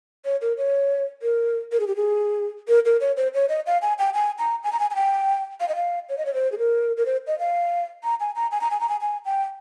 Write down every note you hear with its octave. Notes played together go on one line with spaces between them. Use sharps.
C#5
A#4
C#5
A#4
A#4
G#4
G4
G#4
A#4
A#4
C#5
C5
C#5
D#5
F5
G#5
G5
G#5
A#5
G#5
A#5
G#5
G#5
G5
F5
D#5
F5
C#5
D#5
C#5
C5
G#4
A#4
A#4
C5
D#5
F5
A#5
G#5
A#5
G#5
A#5
G#5
A#5
G#5
G#5
G5